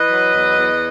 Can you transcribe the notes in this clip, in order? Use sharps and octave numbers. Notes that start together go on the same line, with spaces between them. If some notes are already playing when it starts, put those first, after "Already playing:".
Already playing: E3 B4 D#5
F#3
E2
E2